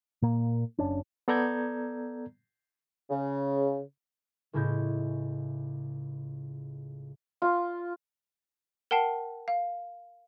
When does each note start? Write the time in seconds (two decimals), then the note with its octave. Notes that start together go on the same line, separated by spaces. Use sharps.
0.22 A#2 A#3
0.79 F#1 C#4 D4
1.28 B3 A4 D5 A#5 G6 G#6
3.10 C#3
4.53 C#2 A2 C#3 E4 D#5 G6
7.42 F4
8.91 A#4 F#5 G5 A5 C7
9.48 F5